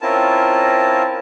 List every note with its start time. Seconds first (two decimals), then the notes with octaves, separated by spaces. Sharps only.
0.01 C4 C#4 E4 F4 A#4 A5